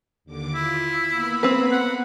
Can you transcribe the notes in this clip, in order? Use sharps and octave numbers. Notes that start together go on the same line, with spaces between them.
D#2 D3 D6
E4 F4
A#3 B3 B5
C4 B4
F#5